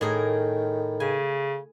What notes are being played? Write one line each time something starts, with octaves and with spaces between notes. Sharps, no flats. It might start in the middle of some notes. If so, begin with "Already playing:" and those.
A2 D#3 G#4 A#4
C#3 G#5